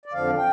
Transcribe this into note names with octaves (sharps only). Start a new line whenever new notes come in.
D5
F2 D3 F3 F5
G5